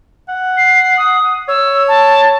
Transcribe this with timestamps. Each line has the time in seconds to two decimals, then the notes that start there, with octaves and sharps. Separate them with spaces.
0.29 F#5
0.57 C7
0.97 D#6
1.48 C#5 E6
1.88 A5